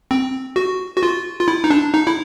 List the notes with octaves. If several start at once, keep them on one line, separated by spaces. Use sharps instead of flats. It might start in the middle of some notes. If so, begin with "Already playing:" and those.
C4
F#4
F#4
F4
F4
E4
D#4
D4
D#4
E4